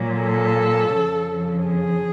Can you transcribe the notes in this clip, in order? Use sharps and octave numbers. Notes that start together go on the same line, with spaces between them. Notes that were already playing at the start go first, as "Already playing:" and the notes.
Already playing: A#2 F#3
A4
F2 C#3 F3
G#4